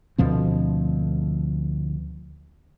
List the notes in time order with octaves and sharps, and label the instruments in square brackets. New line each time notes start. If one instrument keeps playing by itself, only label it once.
[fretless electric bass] D2 B2 F3 C4